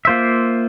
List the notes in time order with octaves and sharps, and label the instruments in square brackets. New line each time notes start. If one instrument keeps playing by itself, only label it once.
[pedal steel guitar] A#3 F4 C5 E5